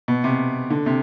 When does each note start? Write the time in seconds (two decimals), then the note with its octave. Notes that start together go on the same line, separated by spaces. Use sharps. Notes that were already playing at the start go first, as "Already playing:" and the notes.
0.08 B2
0.24 C3
0.70 D3
0.86 C3